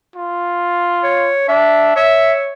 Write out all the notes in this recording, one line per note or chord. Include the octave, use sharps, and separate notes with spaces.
F4
C#5
D4 E5
C#5 E5